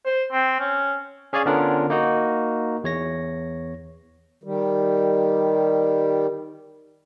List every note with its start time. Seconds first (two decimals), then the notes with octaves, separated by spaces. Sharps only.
0.05 C5
0.32 C4
0.60 C#4
1.33 C#4 G#4 C#5 D5 F5 G#5
1.46 D3 B3 C#4 D4 F4 A#4
1.90 A#3 D#4 F#4
2.84 E2 C#5 A#6
4.44 D#3 G3